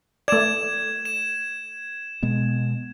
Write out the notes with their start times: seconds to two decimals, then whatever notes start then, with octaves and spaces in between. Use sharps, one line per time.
0.28 A3 D5 G#6 E7
1.05 E7
2.23 B2 G#3 B3